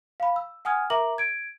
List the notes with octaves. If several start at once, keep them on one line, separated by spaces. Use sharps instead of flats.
F5 B5
E6
F#5 G#5 D#6 F6 G#6
A#4 E5 A#5 D6 F#7
G#6 D7